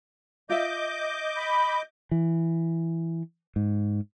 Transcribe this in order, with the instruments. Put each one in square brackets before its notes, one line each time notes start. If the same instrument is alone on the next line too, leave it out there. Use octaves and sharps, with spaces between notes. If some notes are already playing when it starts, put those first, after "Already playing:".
[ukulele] F4 E5 [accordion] D#5 D6 G6
[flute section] B5
[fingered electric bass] E3
G#2